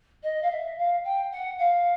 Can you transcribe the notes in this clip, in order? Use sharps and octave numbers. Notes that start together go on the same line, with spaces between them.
D#5
F5
E5
F5
G5
F#5
F5